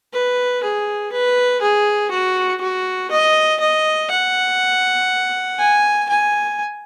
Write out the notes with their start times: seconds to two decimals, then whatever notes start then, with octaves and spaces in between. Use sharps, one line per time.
0.13 B4
0.63 G#4
1.12 B4
1.61 G#4
2.11 F#4
2.61 F#4
3.11 D#5
3.60 D#5
4.11 F#5
5.59 G#5
6.09 G#5